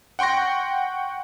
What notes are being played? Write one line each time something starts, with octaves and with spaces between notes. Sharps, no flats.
F#5 G5 C6 C#6 A#6